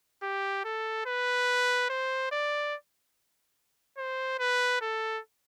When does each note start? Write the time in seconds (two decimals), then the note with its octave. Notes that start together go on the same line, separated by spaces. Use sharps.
0.23 G4
0.64 A4
1.06 B4
1.89 C5
2.32 D5
3.98 C5
4.39 B4
4.81 A4